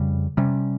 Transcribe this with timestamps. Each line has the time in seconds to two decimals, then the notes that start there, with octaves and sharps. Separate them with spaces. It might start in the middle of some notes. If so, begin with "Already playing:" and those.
Already playing: F2 C#3 G3
0.37 C3 G3 C#4